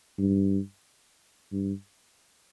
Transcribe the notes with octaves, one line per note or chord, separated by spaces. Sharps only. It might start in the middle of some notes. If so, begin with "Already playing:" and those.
G2
G2